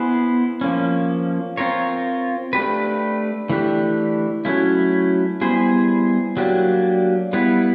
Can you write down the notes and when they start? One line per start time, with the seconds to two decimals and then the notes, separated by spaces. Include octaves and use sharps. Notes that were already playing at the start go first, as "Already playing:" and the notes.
Already playing: B3 E4 G#4 C5
0.61 F3 A#3 C#4
1.57 C4 F4 A#4 C#5
2.53 A3 D4 G4 B4
3.50 E3 A3 D4 G4
4.45 F#3 A3 C#4 E4
5.41 G3 B3 E4 G#4 C5
6.37 F#3 A#3 D4 G4
7.33 G3 B3 E4